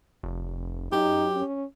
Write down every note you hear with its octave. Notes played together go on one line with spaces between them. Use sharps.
F1
F#2 D#4 G4
C#4